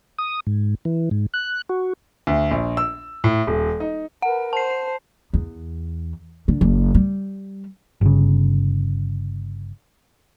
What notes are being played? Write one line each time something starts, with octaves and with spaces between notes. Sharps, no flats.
D#6
G#2
E3
G#2
F#6
F#4
D2
A#1
E6
A2
D#1
D#4
A#4 B4 F#5
C5 A5 C7
E2
D3
F#1
G3
G1 C#3